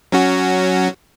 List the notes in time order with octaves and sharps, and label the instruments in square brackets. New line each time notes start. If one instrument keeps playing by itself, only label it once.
[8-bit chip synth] F#3 C#4 F#4